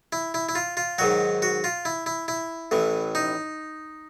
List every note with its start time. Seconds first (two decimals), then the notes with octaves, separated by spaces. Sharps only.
0.13 E4
0.34 E4
0.49 E4
0.55 F4
0.77 F4
0.98 G#2 D#3 F#3 F#4
1.42 F#4
1.64 F4
1.85 E4
2.06 E4
2.28 E4
2.71 A1 A2 E3
3.15 D#4